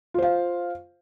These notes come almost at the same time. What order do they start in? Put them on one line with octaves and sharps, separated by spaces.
F4 C5 F5